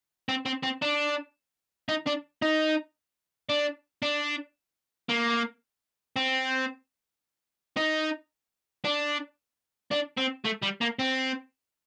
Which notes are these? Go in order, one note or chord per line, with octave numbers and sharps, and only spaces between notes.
C4
C4
C4
D4
D#4
D4
D#4
D4
D4
A#3
C4
D#4
D4
D4
C4
A3
G3
A#3
C4